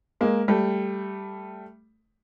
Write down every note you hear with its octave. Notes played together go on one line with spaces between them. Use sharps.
G#3 A#3
G3 A3